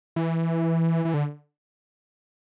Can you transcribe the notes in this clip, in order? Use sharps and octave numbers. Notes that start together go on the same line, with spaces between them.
E3
E3
D3